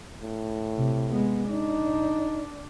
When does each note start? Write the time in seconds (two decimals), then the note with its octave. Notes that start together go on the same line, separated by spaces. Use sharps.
0.23 A2
0.76 C3
1.10 G#3 B3
1.50 D4 D#4